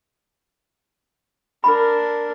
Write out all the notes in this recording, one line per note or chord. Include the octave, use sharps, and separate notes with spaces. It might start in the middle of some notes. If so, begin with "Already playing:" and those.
D4 A#4 B5